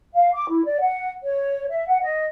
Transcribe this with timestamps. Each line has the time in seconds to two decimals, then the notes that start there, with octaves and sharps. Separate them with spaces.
0.14 F5
0.34 D6
0.50 E4
0.65 D5
0.80 F#5
1.23 C#5
1.69 E5
1.87 F#5
2.01 D#5